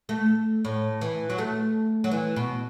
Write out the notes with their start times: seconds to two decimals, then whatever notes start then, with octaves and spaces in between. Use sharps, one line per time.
0.09 A3
0.65 A2
1.01 E3
1.30 F#3
1.38 A3
2.04 F#3
2.11 E3
2.36 B2